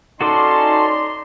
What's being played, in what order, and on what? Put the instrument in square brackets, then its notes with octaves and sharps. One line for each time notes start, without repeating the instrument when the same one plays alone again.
[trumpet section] C#4 A5 [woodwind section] D#4 C6 [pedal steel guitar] F#4 A4 D6 [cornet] D5